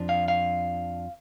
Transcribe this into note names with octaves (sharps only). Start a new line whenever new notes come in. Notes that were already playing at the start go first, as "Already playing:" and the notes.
Already playing: F2 F3 D4
F5
F5